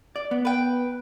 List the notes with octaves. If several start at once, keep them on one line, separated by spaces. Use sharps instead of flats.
D5
B3
B4 G5